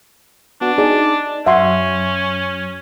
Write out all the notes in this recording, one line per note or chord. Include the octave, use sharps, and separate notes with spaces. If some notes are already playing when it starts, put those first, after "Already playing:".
B3 D4 F#4
D#4 G#4 D5
F#2 F#3 C#4 E5 F#5 C6